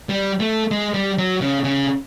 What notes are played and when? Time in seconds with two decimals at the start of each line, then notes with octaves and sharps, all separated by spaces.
0.09 G3
0.40 A3
0.71 G#3
0.94 G3
1.19 F#3
1.41 C#3
1.64 C#3